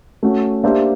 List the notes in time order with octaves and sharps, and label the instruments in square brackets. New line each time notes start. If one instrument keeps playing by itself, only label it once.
[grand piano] A3 C#4 F#4
A#3 D4 G4 C5 E5